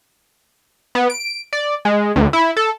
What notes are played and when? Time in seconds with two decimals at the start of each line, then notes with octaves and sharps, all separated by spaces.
0.95 B3
1.10 D7
1.53 D5
1.85 G#3
2.16 D2
2.33 E4
2.57 A4